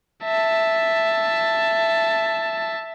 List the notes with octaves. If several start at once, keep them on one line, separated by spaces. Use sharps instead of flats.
E5 A5